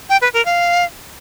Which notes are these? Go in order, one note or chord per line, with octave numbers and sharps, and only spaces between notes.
G5
B4
A#4
F5